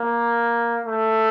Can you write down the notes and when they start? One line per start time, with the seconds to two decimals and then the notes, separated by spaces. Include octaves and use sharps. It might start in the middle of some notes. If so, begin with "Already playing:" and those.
Already playing: A#3
0.86 A3